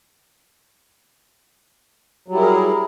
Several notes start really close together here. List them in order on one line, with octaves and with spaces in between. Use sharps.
F#3 G3 E4 A#4 G#4